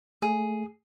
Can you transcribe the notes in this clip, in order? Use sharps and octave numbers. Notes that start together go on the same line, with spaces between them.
A3 G#4